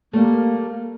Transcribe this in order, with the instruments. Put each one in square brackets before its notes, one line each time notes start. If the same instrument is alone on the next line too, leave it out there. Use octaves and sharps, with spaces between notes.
[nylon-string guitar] G3 A3 [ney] A#3